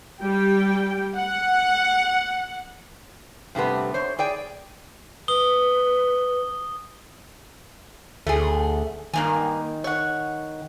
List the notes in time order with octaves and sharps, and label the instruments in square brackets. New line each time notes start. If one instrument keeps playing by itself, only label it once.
[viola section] G3 G5
F#5
[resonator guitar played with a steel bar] G2 C3 A3 B3
C5 C#5
G#4 D5 G5
[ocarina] B4 [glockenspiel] D#6 G7
[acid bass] D2 [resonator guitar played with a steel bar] A3 G#4
[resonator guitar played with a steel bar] G2 A#3 G#5 [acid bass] D#3
[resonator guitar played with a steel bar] C#5 F#5